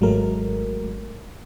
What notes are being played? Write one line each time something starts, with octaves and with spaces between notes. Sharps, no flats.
G#1 F#3 G#3 A3 A#4